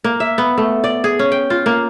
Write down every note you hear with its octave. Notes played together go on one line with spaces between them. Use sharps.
A#3
E5
B3
A3
D5
G#4
C#4
G5
F4
A#3